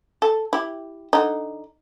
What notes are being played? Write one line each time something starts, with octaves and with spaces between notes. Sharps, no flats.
A4
E4 G4
D3 D#4